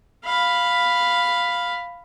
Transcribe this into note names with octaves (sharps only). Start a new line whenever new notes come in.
F5 B5